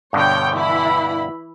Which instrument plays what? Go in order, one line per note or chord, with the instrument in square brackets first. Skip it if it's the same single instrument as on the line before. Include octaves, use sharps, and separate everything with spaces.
[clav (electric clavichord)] G2 B2 D3 [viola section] C#5 G5
[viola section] E3 E4 B5